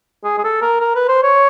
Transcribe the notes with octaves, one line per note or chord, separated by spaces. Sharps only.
G#4
G#4
A4
A#4
A#4
B4
C5
C#5